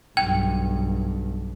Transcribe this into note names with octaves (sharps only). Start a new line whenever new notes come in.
B1 G2 G5